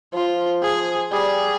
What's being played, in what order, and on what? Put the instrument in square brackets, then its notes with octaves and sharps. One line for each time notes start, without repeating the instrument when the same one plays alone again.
[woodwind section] F3 [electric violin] F4
[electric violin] G#4
[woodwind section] G3 [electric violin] G#4